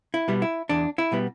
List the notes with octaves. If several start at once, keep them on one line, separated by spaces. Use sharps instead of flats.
E4
B2 G3 B3
E4
E2 D4
E4
B2 G3 B3